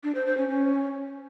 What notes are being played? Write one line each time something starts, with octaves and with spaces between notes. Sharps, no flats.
D4
C5
C5
C#4
C#4